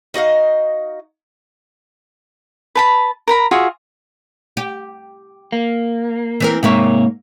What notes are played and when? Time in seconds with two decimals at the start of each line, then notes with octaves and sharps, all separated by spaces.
0.14 D#4 F#4 D#5 F5
2.75 B4 A5 B5
3.28 A#4 A#5 B5
3.51 F4 F#4 G#4 E5
4.57 G4
5.52 A#3
6.40 E3 C4 A#4
6.63 G#2 C3 A#3 C#5 E5